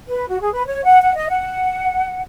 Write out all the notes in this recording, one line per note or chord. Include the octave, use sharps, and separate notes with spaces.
B4
F#4
G#4
B4
C#5
F#5
F#5
D#5
F#5